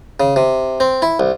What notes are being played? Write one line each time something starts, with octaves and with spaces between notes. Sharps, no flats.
C#3
C3
C4
E4
C2